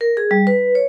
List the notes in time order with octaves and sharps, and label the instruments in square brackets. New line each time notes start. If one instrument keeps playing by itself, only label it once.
[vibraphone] A#4
G#4
G3
B4
C#5